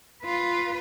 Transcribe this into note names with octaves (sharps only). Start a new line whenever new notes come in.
F4 B4